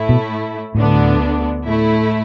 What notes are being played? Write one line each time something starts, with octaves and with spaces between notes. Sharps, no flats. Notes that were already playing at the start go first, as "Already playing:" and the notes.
Already playing: A2 A3 E4
B2
D2 A2 D3 B3 D4
A2 A3 E4